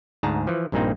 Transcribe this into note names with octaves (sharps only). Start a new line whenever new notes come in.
D2 G#2 G#4 A5 A#5
E3 F3
A#1 G2 A#2 A#3 C4 D#4